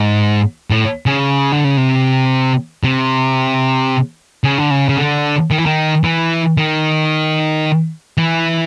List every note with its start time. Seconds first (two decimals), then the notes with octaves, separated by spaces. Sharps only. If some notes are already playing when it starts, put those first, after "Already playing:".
Already playing: G#2
0.70 A2
1.06 C#3
1.52 D3
1.64 C#3
1.77 C3
2.84 C3
4.44 C#3
4.58 D3
4.71 C#3
4.89 C#3
4.97 D3
5.51 D#3
5.58 E3
5.66 D#3
6.04 E3
6.57 D#3
8.18 E3